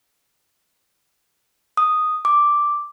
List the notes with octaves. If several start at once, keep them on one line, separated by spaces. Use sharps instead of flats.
D#6
D6